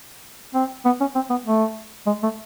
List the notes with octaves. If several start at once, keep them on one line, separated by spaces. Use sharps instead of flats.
C4
B3
C#4
C4
B3
A3
G#3
A3